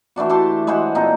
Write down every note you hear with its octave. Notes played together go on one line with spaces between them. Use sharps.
E3 A3 D4 F#4
G4 A4 A5 C6
G#3 B4 C5 F#5
A#2 C4 D#4 A4